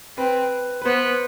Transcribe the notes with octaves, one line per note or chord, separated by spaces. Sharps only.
C4 B4
B4
B3 C5